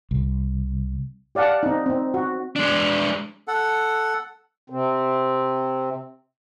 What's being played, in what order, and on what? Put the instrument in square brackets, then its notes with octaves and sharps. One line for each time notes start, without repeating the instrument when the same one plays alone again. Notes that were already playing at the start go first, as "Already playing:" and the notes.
[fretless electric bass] C2
[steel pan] G4 D5 F5 F#5 A5
C4 D#4
C4 D#4
F#4
[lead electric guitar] G#3 D4
[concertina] A4 F#5
[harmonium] C3 C4